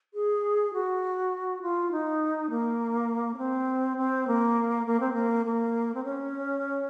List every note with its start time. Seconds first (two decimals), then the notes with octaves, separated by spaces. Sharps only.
0.14 G#4
0.73 F#4
1.62 F4
1.92 D#4
2.50 A#3
3.34 C#4
3.38 C4
3.97 C4
4.27 A#3
4.86 A#3
5.00 C4
5.13 A#3
5.45 A#3
5.94 C4
6.04 C#4